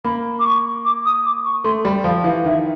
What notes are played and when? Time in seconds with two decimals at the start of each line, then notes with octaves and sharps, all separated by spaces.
0.04 A#3 B5
0.39 D6
0.45 C#6
0.84 D6
1.05 D#6
1.24 D6
1.44 C#6
1.64 A3 C6
1.85 G3 B5
2.04 F3 F5
2.24 E3 F5
2.44 D#3 E5